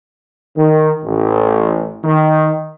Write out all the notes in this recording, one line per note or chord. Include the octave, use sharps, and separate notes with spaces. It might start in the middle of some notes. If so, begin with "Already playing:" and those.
D#3
A1
D#3